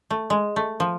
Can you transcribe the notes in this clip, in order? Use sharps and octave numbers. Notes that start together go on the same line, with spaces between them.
A3
G#3
A3
F3